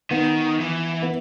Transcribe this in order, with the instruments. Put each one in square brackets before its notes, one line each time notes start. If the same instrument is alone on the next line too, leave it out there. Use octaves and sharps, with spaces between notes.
[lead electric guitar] D#3 [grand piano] B3
[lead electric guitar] E3
[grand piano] B3